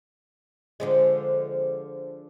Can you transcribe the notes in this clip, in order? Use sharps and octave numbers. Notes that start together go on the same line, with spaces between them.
D3 F3 G#3